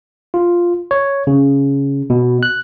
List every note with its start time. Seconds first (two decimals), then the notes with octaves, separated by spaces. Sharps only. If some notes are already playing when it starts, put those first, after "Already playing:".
0.34 F4
0.91 C#5
1.27 C#3
2.10 B2
2.43 F#6